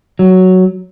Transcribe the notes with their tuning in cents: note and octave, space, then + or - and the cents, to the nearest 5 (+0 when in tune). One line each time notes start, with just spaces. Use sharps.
F#3 +5